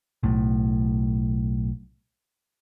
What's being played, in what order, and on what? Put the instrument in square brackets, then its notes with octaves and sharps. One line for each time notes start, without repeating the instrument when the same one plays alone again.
[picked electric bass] B1 A2